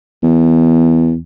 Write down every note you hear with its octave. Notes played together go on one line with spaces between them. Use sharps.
E2